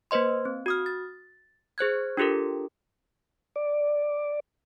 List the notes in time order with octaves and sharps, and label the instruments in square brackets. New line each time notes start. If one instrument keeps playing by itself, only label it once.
[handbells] A#3 B4 C5 D#5 C6
C4
F#4 D#6 F6
A6
G#4 C5 F#6 G#6
D4 F4 G4 A4 A#4
[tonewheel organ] D5